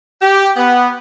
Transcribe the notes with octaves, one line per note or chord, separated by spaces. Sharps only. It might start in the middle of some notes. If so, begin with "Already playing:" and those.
G4
B3